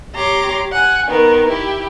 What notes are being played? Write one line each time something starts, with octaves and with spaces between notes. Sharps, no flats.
G4 C#5 A#5 C6 D6
F#5 G#5
D#3 B3 A#4
E4 G4